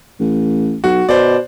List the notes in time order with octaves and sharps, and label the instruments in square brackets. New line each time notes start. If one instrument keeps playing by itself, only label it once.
[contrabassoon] A1
[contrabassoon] B1 [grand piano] F#4
[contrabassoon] B2 [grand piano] C5 D5